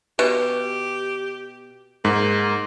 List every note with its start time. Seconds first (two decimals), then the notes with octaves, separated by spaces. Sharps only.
0.19 B2 G4
2.05 G#2 A#3